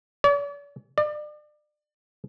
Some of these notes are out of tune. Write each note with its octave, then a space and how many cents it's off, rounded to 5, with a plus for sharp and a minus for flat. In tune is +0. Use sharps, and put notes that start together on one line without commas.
D5 -45
D5 +35